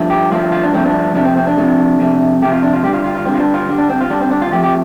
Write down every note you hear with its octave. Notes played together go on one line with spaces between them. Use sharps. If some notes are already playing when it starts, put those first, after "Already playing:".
Already playing: G2 F3 A3
G4
G2 F3 A3 F4
F4
D4
G2 F3 A3 C4
D4
F2 C3 A3 D4
C4
C4
D4
F2 C3 A3
F2 C3 A3
F2 C3 A3 G4
F4
D4
F4
G2 D3 G3 G4
F4
F4
F4
G2 D3 G3 C4
F4
D4
F4
G2 D3 G3
D4
C4
F4
G2 D3 G3 D4
C4
D4
F4
F2 F3 A3 G4
G4